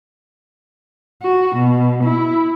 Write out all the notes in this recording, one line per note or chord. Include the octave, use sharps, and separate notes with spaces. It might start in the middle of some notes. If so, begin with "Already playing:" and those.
F#4
B2
E4